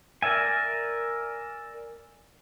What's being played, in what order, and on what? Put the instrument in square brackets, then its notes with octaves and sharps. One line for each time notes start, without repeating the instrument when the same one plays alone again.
[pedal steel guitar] A#4 D5 E5 G#5